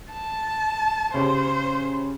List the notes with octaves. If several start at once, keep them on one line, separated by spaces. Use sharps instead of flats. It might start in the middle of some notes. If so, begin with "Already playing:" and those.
A5
C#3 C#4 G4 C5